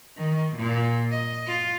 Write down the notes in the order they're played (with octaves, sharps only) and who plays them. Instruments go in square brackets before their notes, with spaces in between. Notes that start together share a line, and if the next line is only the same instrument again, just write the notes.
[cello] D#3
A#2
D#5
F4